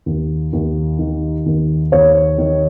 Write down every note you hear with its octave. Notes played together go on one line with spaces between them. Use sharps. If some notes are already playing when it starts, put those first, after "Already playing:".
D#2
D#2
D#3
D#2
D#2 C#5
D#3